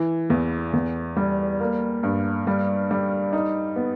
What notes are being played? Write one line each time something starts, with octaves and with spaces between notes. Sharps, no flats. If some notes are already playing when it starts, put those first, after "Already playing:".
Already playing: E3
E2
E2
G3
A#3
G2
G3
G3
D#4
B3